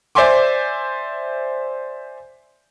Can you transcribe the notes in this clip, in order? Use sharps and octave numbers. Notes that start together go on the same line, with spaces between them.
C5 D5 E5 G#5 C6 D6